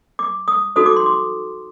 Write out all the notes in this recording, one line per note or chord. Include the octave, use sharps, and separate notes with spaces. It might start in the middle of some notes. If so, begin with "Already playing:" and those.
D6
D#6
D#4 F#4 A4 C5 D#6
D6
C6
D6